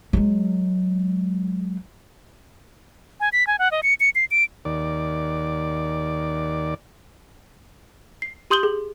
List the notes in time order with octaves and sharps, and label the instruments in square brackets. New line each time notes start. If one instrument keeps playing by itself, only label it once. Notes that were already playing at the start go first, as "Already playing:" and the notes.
[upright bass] F#3 G#3
[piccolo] G#5
B6
G#5
F#5
D#5
C#7
C#7
C7
D7
[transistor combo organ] D#2 D5
[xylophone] C7
G4 C6 D#6 G6 F#7 G7
G#4